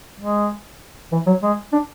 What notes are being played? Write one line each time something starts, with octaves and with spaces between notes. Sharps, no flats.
G#3
E3
F#3
G#3
D4